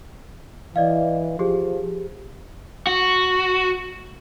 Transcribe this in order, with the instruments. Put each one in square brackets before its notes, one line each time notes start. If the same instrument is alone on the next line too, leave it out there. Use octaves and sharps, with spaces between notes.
[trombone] E3 [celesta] D5 D#5 F5
[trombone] F3 [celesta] G4 G#4
[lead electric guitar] F#4